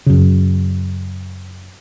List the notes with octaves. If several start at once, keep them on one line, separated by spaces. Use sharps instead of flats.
F#2 C#3